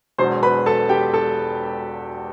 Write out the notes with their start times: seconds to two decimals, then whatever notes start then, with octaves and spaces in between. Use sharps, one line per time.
0.18 E1 E2 B2 F#3 C5 C6
0.43 B4 B5
0.66 A4 A5
0.89 G4 G5
1.14 A4 A5